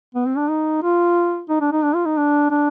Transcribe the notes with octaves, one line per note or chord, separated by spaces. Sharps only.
B3
C4
D4
D#4
F4
D#4
D4
D#4
D4
F4
D#4
D4
D4